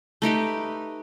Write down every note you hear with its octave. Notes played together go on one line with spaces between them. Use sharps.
A3 D#4 G4 B4